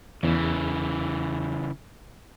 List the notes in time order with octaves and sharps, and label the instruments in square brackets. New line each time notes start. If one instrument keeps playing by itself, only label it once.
[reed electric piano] E2 [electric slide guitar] C#3 E3